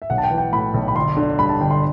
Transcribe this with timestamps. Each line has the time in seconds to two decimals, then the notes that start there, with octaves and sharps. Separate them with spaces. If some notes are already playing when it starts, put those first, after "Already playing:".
0.02 E5
0.10 B1 F#5
0.18 A5
0.24 G5
0.31 E3
0.38 G5
0.52 A2 B5
0.74 B1
0.88 B5
0.95 G1 C6
1.17 D3
1.39 G2 B5
1.49 A5
1.60 G1 G5
1.71 C6